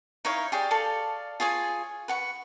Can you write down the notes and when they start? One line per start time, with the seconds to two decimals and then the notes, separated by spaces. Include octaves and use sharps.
0.25 D#4 E4 C#5 F5
0.52 G4 G#4 D5
0.71 A4 D5 F5 C#6
1.40 F4 G#4 C#5 G#5
2.08 B4 F#5 C#6